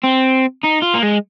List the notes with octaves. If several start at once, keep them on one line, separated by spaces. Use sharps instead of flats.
C4
D#4
F4
A#3
G#3